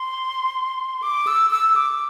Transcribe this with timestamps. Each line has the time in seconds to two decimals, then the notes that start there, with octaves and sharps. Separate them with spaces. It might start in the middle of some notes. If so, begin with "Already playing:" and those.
Already playing: C6
1.03 D6
1.27 E6
1.51 E6
1.76 D6